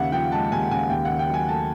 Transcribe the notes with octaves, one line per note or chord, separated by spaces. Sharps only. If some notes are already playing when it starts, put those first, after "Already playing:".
Already playing: D#2 C#3 E5 F#5
F3 G5
G#3 A5
D#2 G#5
C#3 G#5
D#2 G5
D#3 F#5
G5
F#3
G#5
A3 A5